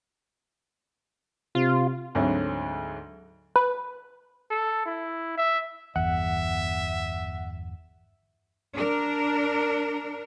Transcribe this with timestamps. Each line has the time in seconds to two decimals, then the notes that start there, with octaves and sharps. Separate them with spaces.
1.55 C3 F4
2.15 D2 G#2 D3 F#3 C4
3.56 B4
4.51 A4
4.86 E4
5.38 E5
5.96 G1 E2 E5 F#5
8.73 D4 A#4